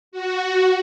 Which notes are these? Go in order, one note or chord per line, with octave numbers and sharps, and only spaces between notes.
F#4